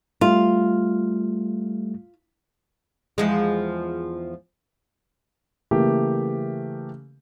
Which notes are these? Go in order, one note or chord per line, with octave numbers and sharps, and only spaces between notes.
G3 A3 F4
E2 F3 G#3
C#3 E3 A3 A#3 G4